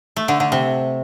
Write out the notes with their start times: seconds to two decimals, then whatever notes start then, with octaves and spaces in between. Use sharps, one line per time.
0.16 A3
0.28 D3
0.40 D3
0.52 C3